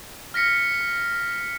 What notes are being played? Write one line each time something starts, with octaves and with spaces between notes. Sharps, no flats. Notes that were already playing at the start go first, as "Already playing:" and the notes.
F6 A#6 B6 C#7